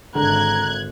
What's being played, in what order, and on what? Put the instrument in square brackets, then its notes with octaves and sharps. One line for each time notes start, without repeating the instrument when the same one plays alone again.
[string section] G#1 F#6 G#6 [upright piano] D3 [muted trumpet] A#4